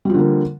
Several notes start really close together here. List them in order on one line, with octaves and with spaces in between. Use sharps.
G3 F3 D3 A#3